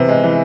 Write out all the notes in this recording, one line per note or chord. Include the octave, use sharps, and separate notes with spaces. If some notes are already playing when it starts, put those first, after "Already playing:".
Already playing: C3 E3 B3
G#3
E3